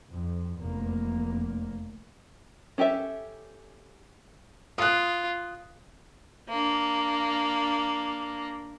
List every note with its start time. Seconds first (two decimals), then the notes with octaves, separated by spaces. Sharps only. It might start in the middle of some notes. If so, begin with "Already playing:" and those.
0.11 F2
0.61 F1 E2 A#3
2.78 C#4 G4 A4 E5
4.78 F4 D#6 F#6
6.49 A#3 D4